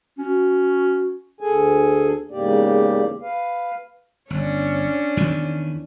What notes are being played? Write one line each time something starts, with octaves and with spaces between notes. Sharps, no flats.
C#4 F#4
D2 G#4 A4 G#5
E2 G#2 C#3 A#3 G4 D5
B4 F5
G1 C#4 D4
E2 D#3 E3